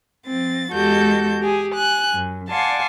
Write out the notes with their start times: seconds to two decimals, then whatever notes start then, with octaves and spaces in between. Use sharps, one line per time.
0.26 F3 C4 A6
0.72 E2 G#3 F#4 G4 A4 G6
1.41 G4 G#4 G#5
1.74 G#5 F#6
2.11 F#2
2.50 D5 F5 F#5 G#5 A5 C6